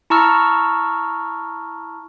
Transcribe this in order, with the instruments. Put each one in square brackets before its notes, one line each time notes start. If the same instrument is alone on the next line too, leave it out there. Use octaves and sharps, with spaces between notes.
[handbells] E4 A5 A#5 C#6 E6 F6